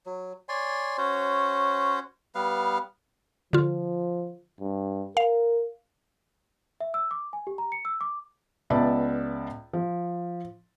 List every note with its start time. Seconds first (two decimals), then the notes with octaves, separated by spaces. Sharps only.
0.06 F#3
0.49 C#5 D5 G#5 C6
0.98 C#4 F#4 C5 C#5
2.35 G3 B3 B4 F5
3.53 D3 F3 F4
4.61 G2
5.17 A#4 F5
6.81 E5
6.94 E6
7.11 D6
7.33 G#5
7.47 G4
7.58 A#5
7.72 C#7
7.85 E6
8.01 D6
8.70 C#2 B3 D5 E5 A5 B5
9.73 F3